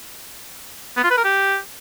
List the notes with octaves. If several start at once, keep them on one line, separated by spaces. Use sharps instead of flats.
B3
F4
B4
A#4
G4